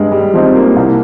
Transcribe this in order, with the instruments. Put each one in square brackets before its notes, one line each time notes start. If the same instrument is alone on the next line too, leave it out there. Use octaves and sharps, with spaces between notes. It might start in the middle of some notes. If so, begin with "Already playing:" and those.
Already playing: [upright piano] G2 [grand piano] G3 G#3
[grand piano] G3
[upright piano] F3 C4 D#4
[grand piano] A#3
[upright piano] C2 [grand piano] A#3